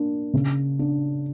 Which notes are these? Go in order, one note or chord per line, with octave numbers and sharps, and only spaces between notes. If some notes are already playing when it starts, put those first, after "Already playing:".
Already playing: A#3 D4
C#3
D4